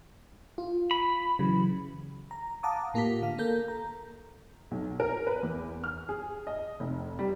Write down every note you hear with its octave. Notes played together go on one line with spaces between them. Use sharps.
F4
B5
C#3 E3 F#3
A#5
F5 F#5 A5 A#5 D6 D#6
A2 A#3 F4 G4 B6
D3 F5
A#3 A4 A#4 G6
A#5
B1
A#4
B4
E2
F6
G#4
D#5
F1
G3